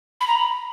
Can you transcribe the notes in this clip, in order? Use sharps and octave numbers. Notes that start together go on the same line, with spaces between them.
B5
A#5
B5